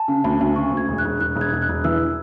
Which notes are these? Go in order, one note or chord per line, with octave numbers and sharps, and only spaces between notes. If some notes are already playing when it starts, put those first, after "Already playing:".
Already playing: G#5 A5
C#3
D2 B5
D2
C#3 C#6
D2
G#6
E1
F#6
E1
E1 F#6
E1
G#6
E1
F#6
E1
E3 E6